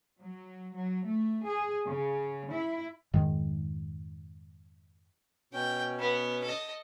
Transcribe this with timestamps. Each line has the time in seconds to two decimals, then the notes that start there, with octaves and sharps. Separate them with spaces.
0.21 F#3
0.75 F#3
1.06 A3
1.46 G#4
1.87 C#3
2.50 E4
3.14 F2 G#2 D#3 G#3
5.53 B2 C#4 G5
5.99 B3
6.44 A4 D#5